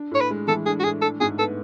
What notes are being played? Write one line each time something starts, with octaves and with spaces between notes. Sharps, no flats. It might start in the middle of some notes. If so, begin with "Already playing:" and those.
Already playing: D4
A2 C#5
B4
G#3
E3 A4
D4 G#4
F#4
A2 G#4
D4 A4
G#2 G#4
B3 A4